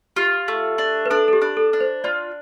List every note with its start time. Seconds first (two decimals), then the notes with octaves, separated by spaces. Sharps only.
0.16 F4 G4
0.48 A3
0.78 D4
1.06 B4
1.10 D4 A4
1.28 A4
1.33 G4
1.41 D4
1.57 A4
1.73 D4
1.80 C5
2.04 F4 D5